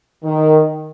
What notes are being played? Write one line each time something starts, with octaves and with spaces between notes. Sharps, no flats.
D#3